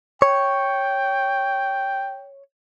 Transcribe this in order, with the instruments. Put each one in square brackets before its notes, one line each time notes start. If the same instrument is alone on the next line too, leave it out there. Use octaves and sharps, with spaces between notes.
[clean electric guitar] C#5 [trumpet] G5